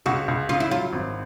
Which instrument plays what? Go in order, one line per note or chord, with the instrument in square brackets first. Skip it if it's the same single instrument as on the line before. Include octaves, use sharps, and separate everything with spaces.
[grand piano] C#2 [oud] F#4
[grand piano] C#2
[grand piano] C#3 [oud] F4
[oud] E4
[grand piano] F#3 [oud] F4
[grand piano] G#1